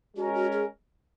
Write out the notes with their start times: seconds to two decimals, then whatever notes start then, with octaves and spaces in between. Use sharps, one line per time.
0.16 G#3 C#4 F#4 A#4
0.34 F#4
0.52 G#4